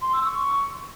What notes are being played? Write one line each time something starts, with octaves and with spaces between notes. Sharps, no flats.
C6
E6
C#6